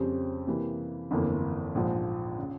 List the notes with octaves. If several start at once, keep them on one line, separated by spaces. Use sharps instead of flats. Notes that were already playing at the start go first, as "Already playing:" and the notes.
Already playing: F2 C#3 G3 C4 G4
C3 E3 G3 A#3
G1 F2 E3 A#3
A#1 G#2 F3
C#3